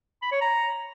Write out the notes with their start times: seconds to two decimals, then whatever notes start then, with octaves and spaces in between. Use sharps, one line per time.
0.22 B5
0.32 C#5
0.41 A#5